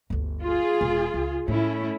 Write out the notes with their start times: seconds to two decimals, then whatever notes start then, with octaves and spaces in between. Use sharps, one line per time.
0.10 G1 D2
0.43 F4 G#4
0.81 E1
1.14 C#2
1.48 A2 A3 C#4 E4